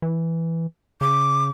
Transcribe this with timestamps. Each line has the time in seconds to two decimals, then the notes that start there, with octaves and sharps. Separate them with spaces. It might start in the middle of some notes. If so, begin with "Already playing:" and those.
0.02 E3
1.01 C#3 D6